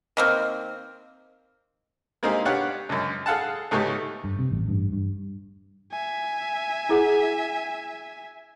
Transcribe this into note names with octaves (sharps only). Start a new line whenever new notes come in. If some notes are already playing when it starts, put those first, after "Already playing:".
D#3 A#3 C4
G#3 A#3 C4 D#4 G4 G#4
B3 D4 G4 C#5 F5 F#5
C#2 F#2
G#4 A4 F5 F#5 A5
C#2 G#2 A3 B3 G4 C#5
G2
C3
A1
G2
G2
E5 G#5
E4 G#4 F#5